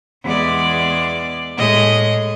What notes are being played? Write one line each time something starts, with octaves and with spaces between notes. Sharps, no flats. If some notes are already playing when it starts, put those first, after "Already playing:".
E2 G#3 D5
A2 G#3 D#5